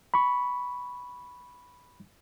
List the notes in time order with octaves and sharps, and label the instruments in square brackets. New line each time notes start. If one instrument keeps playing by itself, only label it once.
[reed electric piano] B5 C#6